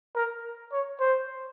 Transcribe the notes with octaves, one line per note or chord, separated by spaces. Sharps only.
A#4
C#5
C5